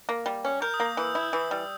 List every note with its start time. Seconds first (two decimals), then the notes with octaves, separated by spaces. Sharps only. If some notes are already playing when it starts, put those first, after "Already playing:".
0.09 A#3
0.26 G3
0.45 C#4
0.62 A#4 G6
0.74 D#6
0.80 A#3
0.86 D#6
0.97 E3 E6
1.15 E4
1.33 E3 D#6
1.51 G3